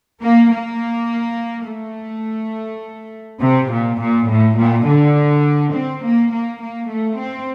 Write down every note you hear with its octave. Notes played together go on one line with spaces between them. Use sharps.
A#3
A#3
A3
C3
A#2
A#2
A2
A#2
D3
C4
A#3
A#3
A#3
A3
C4